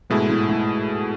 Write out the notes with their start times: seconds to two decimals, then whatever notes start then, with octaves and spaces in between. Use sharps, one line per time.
0.10 G#2 B2 A3 E4 G#4
0.30 A2
0.49 A2